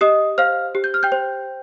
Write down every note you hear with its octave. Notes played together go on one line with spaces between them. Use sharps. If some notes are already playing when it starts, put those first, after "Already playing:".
G4 D#5 D#6
C5 F5 F6
G4
G6
F6
G5 G6
C5